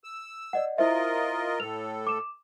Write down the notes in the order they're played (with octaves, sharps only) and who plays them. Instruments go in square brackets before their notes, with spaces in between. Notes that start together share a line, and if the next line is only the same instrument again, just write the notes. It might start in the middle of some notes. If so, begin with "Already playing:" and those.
[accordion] E6
[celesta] D5 D#5 F#5
[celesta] E4 C5 E5 [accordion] F4 A#4 D#5
[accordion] A2 A4 [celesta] F7
[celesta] D6 E7